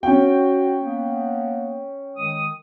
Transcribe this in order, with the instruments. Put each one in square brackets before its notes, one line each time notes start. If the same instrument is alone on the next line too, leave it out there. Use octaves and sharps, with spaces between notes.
[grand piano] C#4 G5 [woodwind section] F#4
[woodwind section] A#3 B3
D#3 G#3 D#6